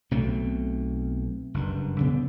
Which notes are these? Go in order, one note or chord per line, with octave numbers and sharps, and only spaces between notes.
B1 B2 A3 C4
F#1 G2
C#3 B3 C4